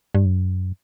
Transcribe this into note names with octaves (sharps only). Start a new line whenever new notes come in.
G2
F#2